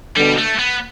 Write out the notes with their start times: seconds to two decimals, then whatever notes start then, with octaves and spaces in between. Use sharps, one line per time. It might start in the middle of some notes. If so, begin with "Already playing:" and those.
0.16 B2 D3 G3
0.38 A3
0.59 B3